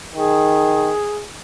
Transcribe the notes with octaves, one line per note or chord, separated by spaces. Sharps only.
D#3 G#4